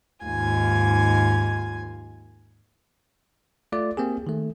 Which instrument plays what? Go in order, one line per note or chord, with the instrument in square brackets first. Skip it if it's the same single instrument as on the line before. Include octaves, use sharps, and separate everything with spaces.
[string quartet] D#2 G#2 F4 G#5 G#6
[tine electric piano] A3 F4 D5
A#3 C4 G4 G#4
D#3 A3